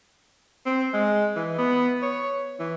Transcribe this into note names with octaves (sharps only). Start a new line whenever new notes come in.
C4
G#3
E3
B3
C#5
E3